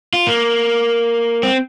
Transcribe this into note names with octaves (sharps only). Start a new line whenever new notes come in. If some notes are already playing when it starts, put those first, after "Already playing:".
F4
A#3
C4